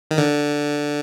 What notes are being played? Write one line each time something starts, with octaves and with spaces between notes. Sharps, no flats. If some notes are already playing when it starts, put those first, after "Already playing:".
D#3
D3